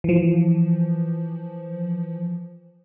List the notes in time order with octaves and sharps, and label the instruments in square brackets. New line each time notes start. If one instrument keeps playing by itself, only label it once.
[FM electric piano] E3 F3